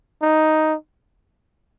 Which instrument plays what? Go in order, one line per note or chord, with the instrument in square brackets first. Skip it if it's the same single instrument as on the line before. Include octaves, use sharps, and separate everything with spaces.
[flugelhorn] D#4